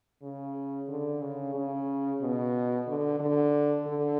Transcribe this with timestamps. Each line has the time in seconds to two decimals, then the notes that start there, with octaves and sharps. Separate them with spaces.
0.23 C#3
0.89 D3
1.22 C#3
1.55 C#3
2.22 B2
2.87 D3
3.20 D3
3.87 D3